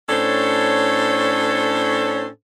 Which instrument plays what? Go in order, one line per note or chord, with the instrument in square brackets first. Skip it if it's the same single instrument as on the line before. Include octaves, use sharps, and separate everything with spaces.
[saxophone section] A2 C#4 D4 A4 C5 C#5